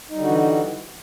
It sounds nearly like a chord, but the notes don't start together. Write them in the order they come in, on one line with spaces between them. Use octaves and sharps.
D#4 G3 D3 F#4 E3